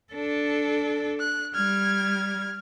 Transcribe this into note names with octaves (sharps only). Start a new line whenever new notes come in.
D4 A4
F#6
G3 F6 G#6